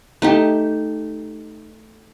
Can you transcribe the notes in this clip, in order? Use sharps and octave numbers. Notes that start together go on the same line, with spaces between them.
A3 D#4 G4